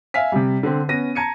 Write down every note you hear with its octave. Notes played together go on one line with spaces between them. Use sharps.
E5 F5 G#5 B6
C3 G3
D3 C4
B3 C#4 A#6 D#7
A5 A#5 G#6 C#7 D#7